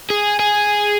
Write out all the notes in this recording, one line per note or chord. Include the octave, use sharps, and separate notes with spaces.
G#4
G#4